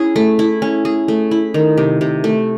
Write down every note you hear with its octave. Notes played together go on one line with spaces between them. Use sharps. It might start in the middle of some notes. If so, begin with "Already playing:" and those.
Already playing: C#4 E4 G#4
A3
E4
C#4
G#4
A3
E4
D#3
C3
C3
A3